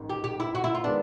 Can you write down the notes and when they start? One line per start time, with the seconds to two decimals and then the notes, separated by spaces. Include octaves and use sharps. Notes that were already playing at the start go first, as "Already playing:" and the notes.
Already playing: A1 G#2 D#3
0.10 G4
0.24 G4
0.40 E4
0.55 F#4
0.64 E4
0.75 F4
0.84 D#3 G#3 B3 D4